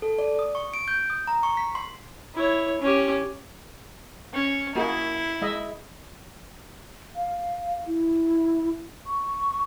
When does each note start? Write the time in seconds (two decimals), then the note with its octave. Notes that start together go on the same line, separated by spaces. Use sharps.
0.02 A4
0.19 D5
0.39 D#6
0.55 C#6
0.74 D7
0.88 G6
1.10 D#6
1.28 A#5
1.43 C#6
1.57 B6
1.75 C6
2.35 E4 C#5
2.81 C#4 G4
4.33 C#4
4.75 A#3 E4 F#4 G#4
5.41 G#3 D#5 E5
7.15 F5
7.86 E4
9.07 C#6